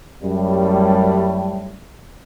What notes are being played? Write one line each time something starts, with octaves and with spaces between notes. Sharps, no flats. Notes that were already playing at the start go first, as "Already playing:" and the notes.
F#2 A2 G3